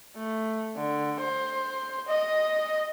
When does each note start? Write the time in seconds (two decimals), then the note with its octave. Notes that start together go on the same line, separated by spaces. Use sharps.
0.17 A3
0.76 D3
1.20 C5
2.08 D#5